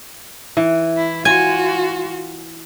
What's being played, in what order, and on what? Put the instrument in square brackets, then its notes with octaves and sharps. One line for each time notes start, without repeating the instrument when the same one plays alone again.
[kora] E3
[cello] E4
[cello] F4 F#4 [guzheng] G#5